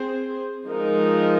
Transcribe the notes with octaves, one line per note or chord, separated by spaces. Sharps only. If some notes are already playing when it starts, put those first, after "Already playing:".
Already playing: C4 G#4 C5
F3 G#3 D#4 A#4